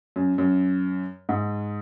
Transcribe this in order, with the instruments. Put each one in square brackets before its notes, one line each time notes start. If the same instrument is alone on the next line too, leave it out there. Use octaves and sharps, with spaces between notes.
[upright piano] F#2
F#2
G#2